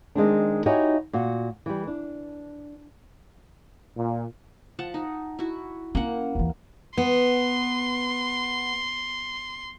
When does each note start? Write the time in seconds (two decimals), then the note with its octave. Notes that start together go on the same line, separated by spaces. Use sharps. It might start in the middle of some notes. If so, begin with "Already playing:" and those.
0.15 D#3 G#3 C4 D4
0.66 D#4 E4 F#4 G4 C#5 G#5
1.13 A#2 F#4
1.66 E3 G3
1.87 D4
3.97 A#2
4.79 F3 F#5 A5
4.94 D#4
5.39 E4 F#4
5.95 A#3 C#4 F#5
6.35 D#2 E3
6.97 B3 C6